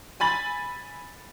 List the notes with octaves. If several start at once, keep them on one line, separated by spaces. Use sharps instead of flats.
G#5 B5 A6 F#7